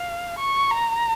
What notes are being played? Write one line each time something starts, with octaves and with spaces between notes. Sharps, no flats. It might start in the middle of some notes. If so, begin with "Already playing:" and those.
Already playing: F5
C#6
A#5